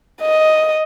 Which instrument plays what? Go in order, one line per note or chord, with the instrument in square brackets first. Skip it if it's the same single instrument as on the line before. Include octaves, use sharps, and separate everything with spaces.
[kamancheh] D#5